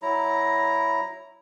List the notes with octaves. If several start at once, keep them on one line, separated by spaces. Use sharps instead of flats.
F#3 E4 A#5